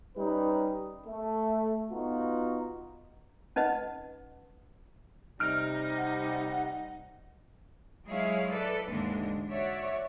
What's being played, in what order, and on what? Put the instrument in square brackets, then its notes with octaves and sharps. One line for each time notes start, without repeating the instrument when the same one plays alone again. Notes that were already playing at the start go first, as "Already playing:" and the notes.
[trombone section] G3 C#4 D#4 B4
A3
B3 D#4 F4 F#4
[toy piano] C#4 D#4 B4 D#5 F#5
[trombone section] C3 G3 [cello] D#4 [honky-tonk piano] F6 D7
[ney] F#5
[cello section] F#3 G#3 E4 G#4 C#5 F5
A4 B4 D5
D#2 G#2 D3 E3 G#3 D4
F#4 C#5 D5 E5